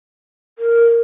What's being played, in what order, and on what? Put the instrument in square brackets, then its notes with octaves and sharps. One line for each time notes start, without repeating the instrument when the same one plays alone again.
[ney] A#4